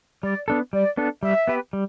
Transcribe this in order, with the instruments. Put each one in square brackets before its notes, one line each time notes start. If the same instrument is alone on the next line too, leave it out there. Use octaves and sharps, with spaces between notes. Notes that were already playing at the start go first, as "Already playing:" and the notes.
[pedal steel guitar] G3 [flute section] D5
[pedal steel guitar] B3 D4 A4
[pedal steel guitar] G3 [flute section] D5
[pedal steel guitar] B3 D4 A4
[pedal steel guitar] G3 [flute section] E5
[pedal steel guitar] B3 G4 B4
G3